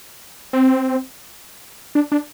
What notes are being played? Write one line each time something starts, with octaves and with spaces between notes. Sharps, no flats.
C4
D4
D4